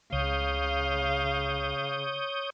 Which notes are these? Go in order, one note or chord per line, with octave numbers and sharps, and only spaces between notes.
C#2 C#3 C#5 F5 D#6 G6